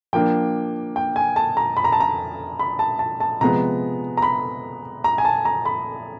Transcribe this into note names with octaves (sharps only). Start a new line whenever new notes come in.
F3 A#3 D4 G5
G5
G#5
A5
A#5
B5
A#5
A5
A#5
B5
A5
A5
A5
C3 F3 G#3 B3 A#5
A#5
B5
A#5
G#5
A5
A#5
B5